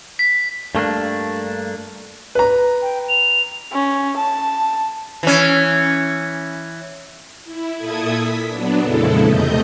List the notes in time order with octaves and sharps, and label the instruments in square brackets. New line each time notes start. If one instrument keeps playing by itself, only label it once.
[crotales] B6
[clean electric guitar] G2 A3 A#3 D4
[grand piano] B4 A#5
[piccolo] G5
F7
[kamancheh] C#4
A5
[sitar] E3 C#4
[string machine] E4
A#2 E4 A4 D#6 G#6
B6
F#3 B3 D4
F2 A#2 C#3 G#3 E4 A4
E2 C3 A3 D#5 G6